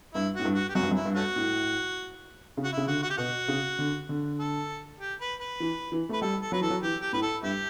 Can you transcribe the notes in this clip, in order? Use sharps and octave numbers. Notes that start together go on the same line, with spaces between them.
G2 E4
A2 F#4
G2
F#4
G4
F#2 F#4
G2
F#2
E4
G2
A3 C#4 F#4
A2
C#3
F#4
C#3 E4
D3 F#4
F#4
G4
B2 F#4
C#3
D3
D3
A4
G4
B4
B4
E3
E3
A3 B4
G3 A4
A4
F#3 B4
E3 A4
F#3
E3 G4
G4
A2 B4
A4
G2 E4 G4